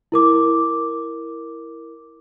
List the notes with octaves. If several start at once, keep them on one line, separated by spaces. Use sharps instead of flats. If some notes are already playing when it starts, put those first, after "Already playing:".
E4 A#4 D6